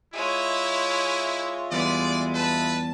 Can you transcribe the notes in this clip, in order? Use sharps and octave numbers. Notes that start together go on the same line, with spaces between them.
G#3 E4 F4 C#5 D#5 E5
E2 G3 G#3 B3 D5
B4 A5